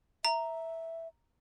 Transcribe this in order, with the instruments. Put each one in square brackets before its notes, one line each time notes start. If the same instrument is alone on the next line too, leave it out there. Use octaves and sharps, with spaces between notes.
[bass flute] E5 [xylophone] A#5